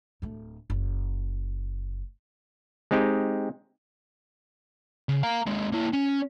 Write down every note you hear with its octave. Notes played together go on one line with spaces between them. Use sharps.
D1 A3
F#1
G#3 C4 D#4 G4
C#3
F5 A#5
D#2 G#3
A#3 E4
C#4